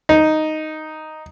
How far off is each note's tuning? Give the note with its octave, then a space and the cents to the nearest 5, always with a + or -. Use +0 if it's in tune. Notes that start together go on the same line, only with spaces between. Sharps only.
D#4 +0